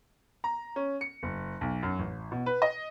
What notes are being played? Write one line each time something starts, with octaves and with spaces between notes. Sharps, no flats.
A#5
C#4
C#7
F#1
B1
F#2
A1
B2
B4
D#5